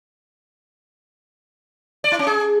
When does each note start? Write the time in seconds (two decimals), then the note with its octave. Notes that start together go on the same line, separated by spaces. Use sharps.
2.04 D5
2.12 E4
2.19 C#4
2.27 G#4